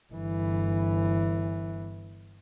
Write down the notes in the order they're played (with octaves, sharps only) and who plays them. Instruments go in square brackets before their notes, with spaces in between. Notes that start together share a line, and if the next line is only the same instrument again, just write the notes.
[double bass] G1 E3